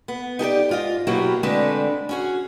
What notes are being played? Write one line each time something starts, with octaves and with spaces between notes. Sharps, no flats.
B3
D#4 G4 A4 D5
G#2 F4 D#5
B2 F#3 A#3 E4 F#4 G4
D3 G#3 A3 C4 D4 B4
C#4 F#4 G#4